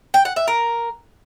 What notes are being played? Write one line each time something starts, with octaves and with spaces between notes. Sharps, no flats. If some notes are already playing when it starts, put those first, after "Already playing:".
G5
F#5
E5
A#4